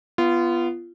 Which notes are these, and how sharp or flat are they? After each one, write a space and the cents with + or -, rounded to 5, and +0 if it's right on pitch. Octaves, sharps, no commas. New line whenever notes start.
B3 +0 F4 -25